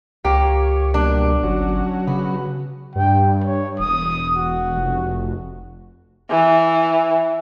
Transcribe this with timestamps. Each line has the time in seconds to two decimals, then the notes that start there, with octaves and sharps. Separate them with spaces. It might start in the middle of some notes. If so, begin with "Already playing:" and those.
0.25 C#2 A#3 G4 C#5
0.94 B2 G3 A#3 D4
1.43 G1 F#3 C#4 F#4
2.07 C#3 B3
2.95 G2 G5
3.44 C#5
3.80 E1 D#6
4.36 F#4
4.76 F1
6.31 E3